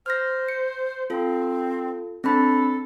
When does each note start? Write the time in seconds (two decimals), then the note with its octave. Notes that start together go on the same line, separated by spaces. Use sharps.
0.06 C5 F6 A#6
0.49 C#7
1.10 C4 F4 A4
2.24 C4 D4 A4 B5